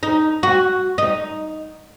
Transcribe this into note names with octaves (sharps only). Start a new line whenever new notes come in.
D#4
F#4
D#4